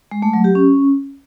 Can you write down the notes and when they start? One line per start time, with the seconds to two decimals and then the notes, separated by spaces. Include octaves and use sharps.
0.11 G#3
0.22 A3
0.33 F#3
0.44 G4
0.55 C#4